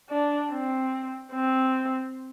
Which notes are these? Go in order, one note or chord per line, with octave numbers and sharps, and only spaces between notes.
D4
C4
C4